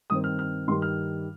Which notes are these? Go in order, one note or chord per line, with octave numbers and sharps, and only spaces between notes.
G2 D#3 C4 D#6
F6
F6
G2 D#3 G3 C6
F6